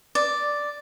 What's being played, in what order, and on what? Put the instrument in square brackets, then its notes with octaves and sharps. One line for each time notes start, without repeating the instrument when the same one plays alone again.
[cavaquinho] D5